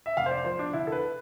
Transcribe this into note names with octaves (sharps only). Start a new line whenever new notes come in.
E5
F1 F5
C5
D5
F3 C5
D4
D3 E4
A4
B4